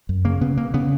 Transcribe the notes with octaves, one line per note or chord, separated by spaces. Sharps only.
F#2
C#3 A#3
C#3 B3
C#3 A#3
C#3 B3